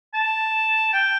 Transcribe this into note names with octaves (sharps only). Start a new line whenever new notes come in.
A5
G5